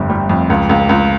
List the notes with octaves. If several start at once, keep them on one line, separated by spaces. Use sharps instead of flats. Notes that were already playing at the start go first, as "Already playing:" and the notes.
Already playing: G1 F2
G3
F2
C#2
C#2
C#2